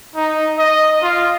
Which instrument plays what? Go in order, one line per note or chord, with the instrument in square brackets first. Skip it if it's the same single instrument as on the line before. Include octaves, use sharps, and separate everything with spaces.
[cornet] D#4
D#5
F4